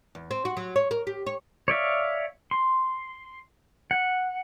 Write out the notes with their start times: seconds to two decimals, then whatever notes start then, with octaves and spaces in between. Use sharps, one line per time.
0.15 E2
0.31 C4
0.45 F#4
0.57 F#3
0.76 C#5
0.91 A#4
1.07 G4
1.26 C#5
1.68 C#5 D5 E5 F5
2.51 C6
3.91 F#5